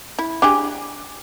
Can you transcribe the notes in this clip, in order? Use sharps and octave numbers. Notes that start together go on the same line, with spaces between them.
E4
D4 G4 G#4